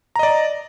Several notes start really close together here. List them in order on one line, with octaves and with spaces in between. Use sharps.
A#5 D#5 D5